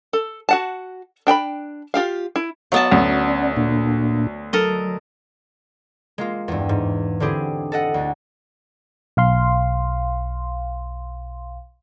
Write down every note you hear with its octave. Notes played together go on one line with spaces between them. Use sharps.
A4
F#4 F#5 A5
D4 G5 A#5 B5
F4 G4 F5
E4
F#3 B3 D#5 F5 A5
D2 C#4 D5
A#2 A#3 D4
F#3 A4 A#4 D#5
G#3 A#3 F4
E2 G2
G#2
D3 C4 E4 G4 G#4
A4 D#5 F#5
D2
B1 F5 C6